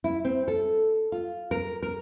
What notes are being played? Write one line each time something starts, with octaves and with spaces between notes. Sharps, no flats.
E4
C4
A4
F4
A#4
A#4